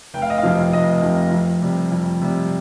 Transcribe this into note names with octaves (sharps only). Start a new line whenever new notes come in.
F1 G5
F5
D#5
F5
F2 C3 F3
F1 D#5
F2 C3 F3
F2
C3 G3
F2
C3 G3